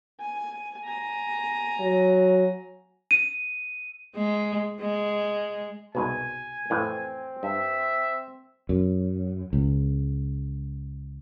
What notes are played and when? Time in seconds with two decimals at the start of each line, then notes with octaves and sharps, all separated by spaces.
0.20 G#5
0.84 G#5 A#5
1.80 F#3
3.11 D#7
4.16 G#3
4.80 G#3
5.95 C2 G#2 B2 G#5
6.70 F2 A2 E3 C4
7.43 G2 E5
8.69 F#2
9.53 C#2